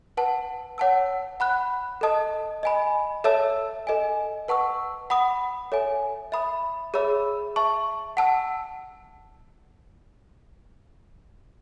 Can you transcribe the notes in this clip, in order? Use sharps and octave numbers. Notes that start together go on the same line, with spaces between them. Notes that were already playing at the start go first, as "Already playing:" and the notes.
B4 F#5 A5
C#5 F#5 A5 E6
F#5 B5 F#6
A4 D#5 A5 D#6
D#5 G#5 B5
A4 C#5 E5 A5 E6
A4 D#5 G#5
B4 F#5 A5 C#6 E6
F#5 B5 D#6
A4 C#5 E5 G#5
E5 B5 D#6
G#4 C#5 E5 B5 E6
E5 A5 C#6
F#5 A5 E6